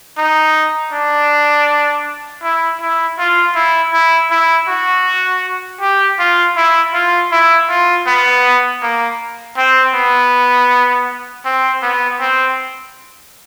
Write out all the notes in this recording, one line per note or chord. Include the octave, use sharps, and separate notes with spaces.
D#4
D4
E4
E4
F4
E4
E4
E4
F#4
G4
F4
E4
F4
E4
F4
B3
A#3
C4
B3
C4
B3
C4